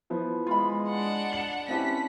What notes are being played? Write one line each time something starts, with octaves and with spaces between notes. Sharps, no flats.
E3 F3 B3
G#3 F4 B5
D4 F#5
E7 F#7
C4 C#4 E4 G4 B4 D#5 A5 B6